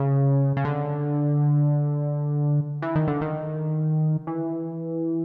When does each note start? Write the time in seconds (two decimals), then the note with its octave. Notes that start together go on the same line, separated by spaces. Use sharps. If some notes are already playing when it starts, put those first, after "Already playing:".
Already playing: C#3
0.57 C#3
0.65 D3
2.82 E3
2.95 D#3
3.08 D3
3.21 D#3
4.27 E3